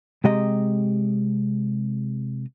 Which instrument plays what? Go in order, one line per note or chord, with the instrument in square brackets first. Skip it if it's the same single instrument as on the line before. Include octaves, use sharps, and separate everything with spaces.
[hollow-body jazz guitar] C3 G#3 G4 D#5 A#5